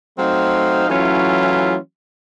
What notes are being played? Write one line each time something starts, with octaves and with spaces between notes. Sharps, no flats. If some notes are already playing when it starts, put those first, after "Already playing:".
F#3 A3 C4 D#4 C5 F5
E3 F#3 A3 C#4 E4 F4